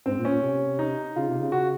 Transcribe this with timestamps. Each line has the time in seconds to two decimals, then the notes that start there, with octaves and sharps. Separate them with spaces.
0.06 G#2 C4
0.19 A#2
0.25 C#4
0.31 A#2
0.43 C3
0.79 D#4
1.15 C#3 F4
1.28 C3
1.40 C#3
1.52 F#4